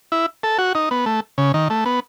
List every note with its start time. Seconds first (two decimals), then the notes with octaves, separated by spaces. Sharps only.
0.12 E4
0.43 A4
0.58 F#4
0.75 D#4
0.91 B3
1.06 A3
1.38 C#3
1.54 D#3
1.70 A3
1.86 B3